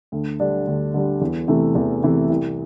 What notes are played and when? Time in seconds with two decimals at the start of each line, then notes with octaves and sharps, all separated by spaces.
0.12 D2
0.40 D3 G3 D4
0.67 D2
0.94 D3 G3 D4
1.21 E2
1.48 C3 E3 A3
1.75 E2
2.03 C3 E3 A3
2.29 C2